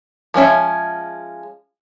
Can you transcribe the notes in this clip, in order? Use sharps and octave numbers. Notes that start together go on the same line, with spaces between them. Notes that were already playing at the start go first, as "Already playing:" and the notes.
F3 G#3 C#4 E5